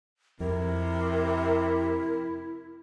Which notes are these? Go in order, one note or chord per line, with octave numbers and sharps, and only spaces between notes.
F2 C3 E4 A#4